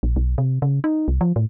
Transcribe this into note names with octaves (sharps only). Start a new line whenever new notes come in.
A#1
B1
C3
C#3
D#4
C2
F3
A2